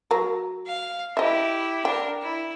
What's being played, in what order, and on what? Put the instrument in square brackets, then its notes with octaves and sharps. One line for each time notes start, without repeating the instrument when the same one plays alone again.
[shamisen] F#3 A#4
[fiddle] F5
[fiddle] E4 G4 [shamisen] D#5 E5
[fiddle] D4 A#4 [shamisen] G5
[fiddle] E4